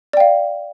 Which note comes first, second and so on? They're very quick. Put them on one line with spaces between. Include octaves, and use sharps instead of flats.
D5 G5 F5